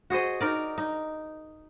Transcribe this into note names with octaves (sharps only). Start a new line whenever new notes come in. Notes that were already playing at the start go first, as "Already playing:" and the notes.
F#4 G#4 C5 D#5
D#4 A#4 D5
D#4